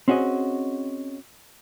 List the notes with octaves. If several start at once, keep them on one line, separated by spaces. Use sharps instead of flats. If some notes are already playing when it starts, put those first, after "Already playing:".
C4 C#4 F#4 G#4 D#5